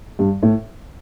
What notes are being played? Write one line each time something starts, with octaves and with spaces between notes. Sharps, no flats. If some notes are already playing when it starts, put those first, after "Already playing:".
G2
A2